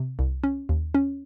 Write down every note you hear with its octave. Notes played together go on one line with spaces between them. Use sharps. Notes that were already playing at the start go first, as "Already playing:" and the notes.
Already playing: C3
C2
C#4
D#2
C#4